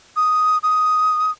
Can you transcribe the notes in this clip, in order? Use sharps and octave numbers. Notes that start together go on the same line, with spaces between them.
D#6
D#6